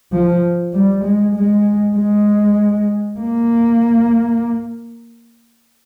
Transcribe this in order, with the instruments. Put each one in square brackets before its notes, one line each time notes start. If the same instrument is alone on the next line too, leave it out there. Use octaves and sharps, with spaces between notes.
[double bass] F3
G3
G#3
G#3
G#3
A#3